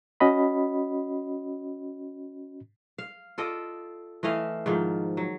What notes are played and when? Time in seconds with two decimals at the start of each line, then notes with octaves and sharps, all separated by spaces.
0.20 C#4 F#4 D#5 B5
2.98 F5
3.38 F4 A4 D5 D#5
4.23 E3 A3 D#5 F5
4.66 G#2 D#3 F3
5.17 F#3